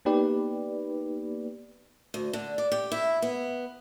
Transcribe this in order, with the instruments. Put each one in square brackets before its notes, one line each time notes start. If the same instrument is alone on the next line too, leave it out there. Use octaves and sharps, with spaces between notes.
[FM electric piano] A#3 B3 D#4 G4 B4 D5
[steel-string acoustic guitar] D2
D3
D5
G4
E4
B3